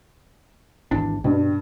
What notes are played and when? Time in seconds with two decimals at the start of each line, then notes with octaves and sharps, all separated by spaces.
0.91 G#1 E2 D4
1.24 G2 B2